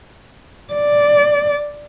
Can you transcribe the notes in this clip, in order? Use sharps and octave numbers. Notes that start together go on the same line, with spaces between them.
D5